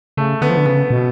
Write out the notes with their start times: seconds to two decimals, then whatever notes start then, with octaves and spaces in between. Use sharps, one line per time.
0.17 C#3 A3
0.42 D3 B3
0.50 F3
0.57 D3
0.66 C#3 B3
0.90 B2